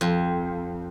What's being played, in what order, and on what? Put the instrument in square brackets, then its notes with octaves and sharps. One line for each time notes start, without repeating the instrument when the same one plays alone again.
[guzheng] F2